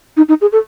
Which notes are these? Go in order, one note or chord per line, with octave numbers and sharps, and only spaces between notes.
D#4
D#4
G#4
A4